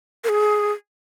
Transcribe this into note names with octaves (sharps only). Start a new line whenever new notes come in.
A#4
G#4